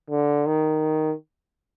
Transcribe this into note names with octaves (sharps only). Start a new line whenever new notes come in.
D3
D#3